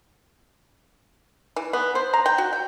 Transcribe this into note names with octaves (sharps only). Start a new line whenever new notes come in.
E3
B3
C5
A#5
G5
F#4
G5